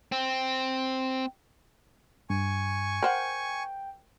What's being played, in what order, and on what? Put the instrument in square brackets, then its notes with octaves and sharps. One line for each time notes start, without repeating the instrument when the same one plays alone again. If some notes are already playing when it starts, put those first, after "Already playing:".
[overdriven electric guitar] C4
[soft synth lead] G2 [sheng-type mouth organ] G#5 C#6
[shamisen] A#4 C5 F#5 [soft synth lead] G5